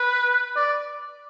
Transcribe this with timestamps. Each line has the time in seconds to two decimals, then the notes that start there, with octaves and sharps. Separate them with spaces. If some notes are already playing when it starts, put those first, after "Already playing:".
Already playing: B4
0.56 D5